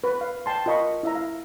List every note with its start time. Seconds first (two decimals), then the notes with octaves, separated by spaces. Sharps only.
0.04 B4
0.21 F5
0.46 G5 A5 C6
0.66 F4 A#4 D#5 B5 C#6
1.03 E4 E5 A#5
1.15 F5